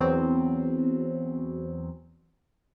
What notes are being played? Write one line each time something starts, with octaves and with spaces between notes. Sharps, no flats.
E2 F#3 C4